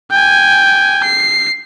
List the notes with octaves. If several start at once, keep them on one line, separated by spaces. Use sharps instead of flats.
G5 G#5
C7